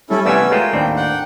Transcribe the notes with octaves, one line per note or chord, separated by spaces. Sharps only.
G3 C#4 E4 A4
C3 E3 A3 B3 C#4 D5 G#5 E6
G#3 A3 F4 A#4 G5
D#2 A2 C4 D4
F#5 G5